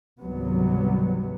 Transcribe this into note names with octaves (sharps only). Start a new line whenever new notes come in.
G#1 C#2 C3 F#3 G3 B3